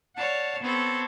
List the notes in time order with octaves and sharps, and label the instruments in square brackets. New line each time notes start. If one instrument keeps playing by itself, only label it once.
[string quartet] C#5 D5 F5 F#5 A5
B3 C4 A4 C#5